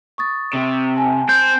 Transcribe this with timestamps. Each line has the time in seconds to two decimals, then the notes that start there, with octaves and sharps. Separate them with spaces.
0.18 C#6 D#6 A6
0.53 C3
0.96 G#5 A5
1.29 C4 G6